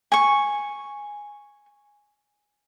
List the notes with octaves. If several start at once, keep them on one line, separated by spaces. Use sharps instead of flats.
G#5 C#6